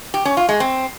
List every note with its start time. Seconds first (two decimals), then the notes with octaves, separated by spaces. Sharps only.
0.14 G4
0.25 C#4
0.37 F4
0.49 G#3
0.60 C4